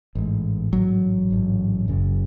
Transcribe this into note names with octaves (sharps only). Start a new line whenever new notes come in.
A1 G#2
A1 G#2 F#3
A1 G#2
F#1 F#2 C#3